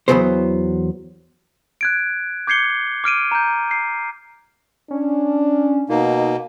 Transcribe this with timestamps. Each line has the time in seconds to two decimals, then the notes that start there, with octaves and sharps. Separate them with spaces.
0.08 E2 G2 E3 F#3 B3 C5
1.81 F#6 G#6 D7
2.47 D6 G6 G#6 C7 C#7 G7
3.04 D6 F6 D7 D#7
3.31 A#5 G6
3.71 C7
4.91 C#4 D4
5.89 B2 A#3 D#4